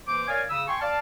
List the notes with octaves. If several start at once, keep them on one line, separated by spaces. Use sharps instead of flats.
E3 A#3 C5 D6
A#4 C#5 D5 F5 G#5
C#3 D#6 E6
G5 G#5 C6 C#6
D5 F5 A5